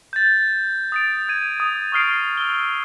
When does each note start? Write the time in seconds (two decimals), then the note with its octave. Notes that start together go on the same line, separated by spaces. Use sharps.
0.13 G6 A6
0.92 D#6 A6 D7
1.29 G#6 D#7
1.60 D#6
1.92 C#6 D#6 F6 C7 D7
2.37 E6 G7